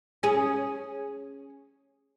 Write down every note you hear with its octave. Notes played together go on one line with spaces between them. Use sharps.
C#4 G#4